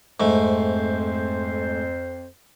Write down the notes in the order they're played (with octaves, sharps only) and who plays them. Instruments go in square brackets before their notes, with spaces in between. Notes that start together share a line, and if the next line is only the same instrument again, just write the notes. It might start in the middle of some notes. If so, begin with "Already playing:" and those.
[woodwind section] F2 C5 [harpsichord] G#2 A3